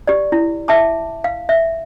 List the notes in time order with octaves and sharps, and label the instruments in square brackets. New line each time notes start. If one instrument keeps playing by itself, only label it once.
[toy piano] G4 D5
E4
E5 A5 D6
F5
E5